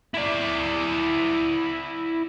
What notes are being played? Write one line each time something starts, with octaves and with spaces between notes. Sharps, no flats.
E4 D5